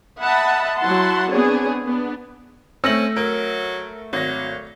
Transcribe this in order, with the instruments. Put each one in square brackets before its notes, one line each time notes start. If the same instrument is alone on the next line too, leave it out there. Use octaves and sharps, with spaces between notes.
[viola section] D#5 E5 F#5 A5 B5
F#3 E4 F#5 A5 C6
B3 C4 D4 G#4 C#5
B3 D4
[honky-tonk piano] A3 E6 [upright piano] C4 A#6 F#7 [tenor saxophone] C#4
[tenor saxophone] F#3 [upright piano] A#4
[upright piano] G#1 A#6 [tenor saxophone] F#3